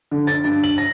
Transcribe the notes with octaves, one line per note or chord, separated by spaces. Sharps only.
D3
A6
G2
F#7
A#6